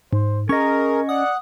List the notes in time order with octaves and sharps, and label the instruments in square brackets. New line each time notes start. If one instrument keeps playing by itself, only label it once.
[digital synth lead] G#2 [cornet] C5
[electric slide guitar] C#4 D#5 [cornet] G#4 [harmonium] A#4 [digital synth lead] C#6
[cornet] D5 [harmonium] F#5 [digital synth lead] D#6